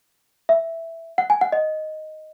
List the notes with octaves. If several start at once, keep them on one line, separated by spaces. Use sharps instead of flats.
E5
F#5
G#5
F#5
D#5